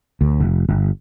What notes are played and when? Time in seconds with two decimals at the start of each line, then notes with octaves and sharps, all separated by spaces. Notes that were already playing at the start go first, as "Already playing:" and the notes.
0.21 D2
0.40 F1
0.69 G1